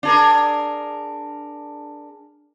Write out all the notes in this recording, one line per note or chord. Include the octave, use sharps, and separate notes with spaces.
D4 G#4 A#4